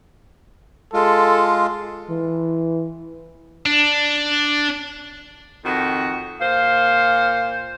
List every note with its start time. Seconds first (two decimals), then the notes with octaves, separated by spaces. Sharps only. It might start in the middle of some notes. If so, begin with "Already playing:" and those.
0.94 G#3 F4 A4
2.10 E3
3.66 D4
5.65 F2 D#3 F#4
6.41 A#2 C5 F5